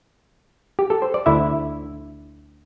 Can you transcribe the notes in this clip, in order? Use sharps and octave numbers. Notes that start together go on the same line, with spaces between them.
G4
A4
C5
D5
D2 D3 E4 E5